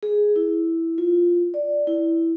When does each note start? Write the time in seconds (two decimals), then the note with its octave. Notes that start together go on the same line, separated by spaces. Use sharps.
0.03 G#4
0.36 E4
0.98 F4
1.54 D5
1.87 E4